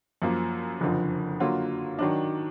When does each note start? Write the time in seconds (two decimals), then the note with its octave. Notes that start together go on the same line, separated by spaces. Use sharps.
0.22 F#2 F3 A#3
0.80 F#1 F2 D3 F3
1.40 D3 F#3 A#3 F4
1.99 D#3 F#3 D4